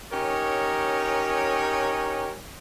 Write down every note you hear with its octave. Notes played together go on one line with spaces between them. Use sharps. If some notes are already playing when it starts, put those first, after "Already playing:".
C#4 D#4 G4 A#4 C#5